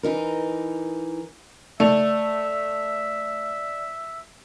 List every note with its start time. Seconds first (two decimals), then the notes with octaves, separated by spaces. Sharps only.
0.03 E3 D#4 A#4
1.80 A3 D5 E5 F7